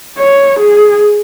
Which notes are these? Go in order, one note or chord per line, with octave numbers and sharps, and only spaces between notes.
C#5
G#4